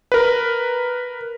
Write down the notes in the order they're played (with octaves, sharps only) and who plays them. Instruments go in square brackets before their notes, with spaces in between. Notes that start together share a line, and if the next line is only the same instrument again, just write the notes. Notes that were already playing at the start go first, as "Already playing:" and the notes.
[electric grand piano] A#4 B4